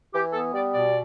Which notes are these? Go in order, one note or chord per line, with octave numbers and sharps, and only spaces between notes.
E3 G4
B3 A4
G3 D5
B2 D5